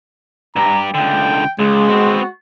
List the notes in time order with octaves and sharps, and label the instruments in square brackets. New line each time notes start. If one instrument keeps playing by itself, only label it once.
[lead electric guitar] G2 G4 [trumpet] A#5
[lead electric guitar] C#2 D3 [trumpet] G5
[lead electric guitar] C#2 [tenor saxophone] G#3
[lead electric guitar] B3 C4 [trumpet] F#4